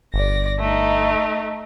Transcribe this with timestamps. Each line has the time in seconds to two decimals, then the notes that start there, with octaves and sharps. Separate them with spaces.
0.14 G1 D5 A#6
0.59 A3 D#4